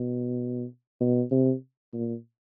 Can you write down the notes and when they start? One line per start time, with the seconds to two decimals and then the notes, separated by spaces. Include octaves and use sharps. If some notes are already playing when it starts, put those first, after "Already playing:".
Already playing: B2
1.00 B2
1.31 C3
1.93 A#2